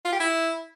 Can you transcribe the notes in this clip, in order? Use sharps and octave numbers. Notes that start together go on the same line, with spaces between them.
F4
G4
E4